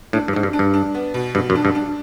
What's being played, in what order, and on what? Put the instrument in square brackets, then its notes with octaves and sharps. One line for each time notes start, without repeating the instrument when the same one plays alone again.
[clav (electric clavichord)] A2 [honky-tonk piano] D4
[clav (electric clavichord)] G2
[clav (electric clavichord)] G#2 [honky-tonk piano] D4
[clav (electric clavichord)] G2
[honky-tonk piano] D4
[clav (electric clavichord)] G2
[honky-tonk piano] D4
B3
B2
[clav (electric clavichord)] G2 [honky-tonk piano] B2
[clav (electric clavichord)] F#2
[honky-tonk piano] D4
[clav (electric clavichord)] G2
[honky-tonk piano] D4